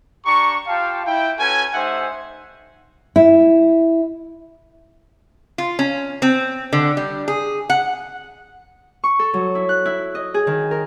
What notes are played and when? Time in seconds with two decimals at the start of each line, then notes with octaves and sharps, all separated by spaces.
0.25 D4 G4 A#5 C#6
0.67 F4 G4 F5 G5 A5
1.06 E4 G5
1.38 C#4 F#4 A4 B4 G#5
1.73 A3 D#4 G4 C5 E5 F#5
3.16 E4
5.58 F4
5.79 C#4
6.22 C4
6.73 D3
6.97 G3
7.28 G#4
7.70 F#5
9.04 C#6
9.19 A4
9.34 F#3
9.55 E4
9.69 F#6
9.85 E4
10.15 D#5
10.34 G#4
10.47 D#3
10.71 A#4